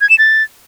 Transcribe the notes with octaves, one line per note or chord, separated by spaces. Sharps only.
G#6
E7
A6